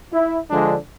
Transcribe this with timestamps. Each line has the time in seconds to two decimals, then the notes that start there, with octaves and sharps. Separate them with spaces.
0.12 E4
0.49 D3 F3 G#3 D4